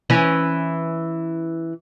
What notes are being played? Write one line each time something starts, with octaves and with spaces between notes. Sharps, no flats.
E3 C#4